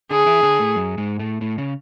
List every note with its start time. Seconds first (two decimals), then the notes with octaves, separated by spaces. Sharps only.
0.10 D3 D4 G#4
0.26 E3 E4
0.43 D3 D4
0.59 A2 A3
0.76 F#2 F#3
0.98 G#2 G#3
1.19 A2 A3
1.41 A2 A3
1.58 C#3 C#4